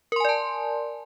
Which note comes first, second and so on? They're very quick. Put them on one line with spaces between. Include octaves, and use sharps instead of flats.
A#4 C6 G#5 D5 A5